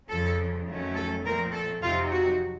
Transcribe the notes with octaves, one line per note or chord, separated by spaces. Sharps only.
F2 C#3 F3 A4
F2 D#3 F#3 A3 C#4
A4
A#2 F3 A3 C4 A#4
A4
F2 C3 F#3 C4 D#4 F4
F#4